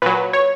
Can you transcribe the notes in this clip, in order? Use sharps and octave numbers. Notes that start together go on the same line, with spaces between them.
A#2 F#3 B4
C#5